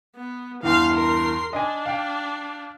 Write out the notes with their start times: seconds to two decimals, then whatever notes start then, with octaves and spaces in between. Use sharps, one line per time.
0.16 B3
0.63 E2 G2 E3 F5 C6
0.93 A#4 C6
1.53 D4 D#5 G#5
1.86 F5 G5